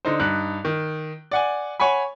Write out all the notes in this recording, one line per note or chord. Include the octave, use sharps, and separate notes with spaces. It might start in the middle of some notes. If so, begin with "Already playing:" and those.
D3 D#4 C5
G2 D#4 F#6
D#3
D5 F#5 G#5
C#5 F#5 G#5 B5